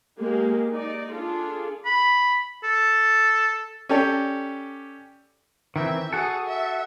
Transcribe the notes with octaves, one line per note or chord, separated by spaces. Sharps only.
G#3 A#3 G4
D#4 D5
D4 F4 G#4 A4
B5
A4
C#4 G4 A4 D5
D#3 E3 C4 E5
F#4 G#4 A4
E5